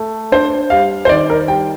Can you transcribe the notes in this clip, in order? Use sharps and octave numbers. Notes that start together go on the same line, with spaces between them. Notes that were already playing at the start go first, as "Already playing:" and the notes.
Already playing: A3
D4 C5
G3 F5
C5
D#3 D5
A#4
G3 G5